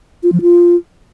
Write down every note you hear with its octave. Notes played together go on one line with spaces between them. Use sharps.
F4
F3
F4